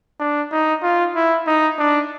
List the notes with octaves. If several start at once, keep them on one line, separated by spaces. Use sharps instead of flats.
D4
D#4
F4
E4
D#4
D4